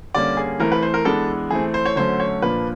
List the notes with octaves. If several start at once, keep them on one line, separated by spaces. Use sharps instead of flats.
D3 G3 A#3 C#4 D5
G#4
E3 A3 C4 A#4
B4
C5
A#4
E3 G#3 B3 D4 A4
E3 A3 C4 G#4
C5
C#5
D3 F#3 A3 C#4 C5
C#5
A#2 F3 A#3 D4 B4